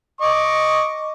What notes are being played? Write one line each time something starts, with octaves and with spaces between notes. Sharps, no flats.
D#5 C#6 D6